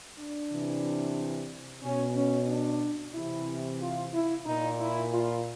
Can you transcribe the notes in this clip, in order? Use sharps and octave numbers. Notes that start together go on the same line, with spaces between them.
D4
C3 E3
B2 C#4
C#4
D4
C3 E3 E4
F4
E4
A#2 D#4
E4
F4